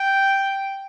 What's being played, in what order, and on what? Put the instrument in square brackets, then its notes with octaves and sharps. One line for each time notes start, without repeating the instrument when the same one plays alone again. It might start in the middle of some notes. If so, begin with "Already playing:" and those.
Already playing: [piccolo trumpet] G5